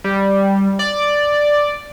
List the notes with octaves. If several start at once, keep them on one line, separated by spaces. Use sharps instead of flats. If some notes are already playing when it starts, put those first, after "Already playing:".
G3
D5